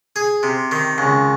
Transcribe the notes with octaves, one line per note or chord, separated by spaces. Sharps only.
G#4
C3
D#3
C#2